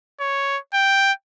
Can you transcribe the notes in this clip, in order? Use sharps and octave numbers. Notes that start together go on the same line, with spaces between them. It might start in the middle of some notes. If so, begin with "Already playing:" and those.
C#5
G5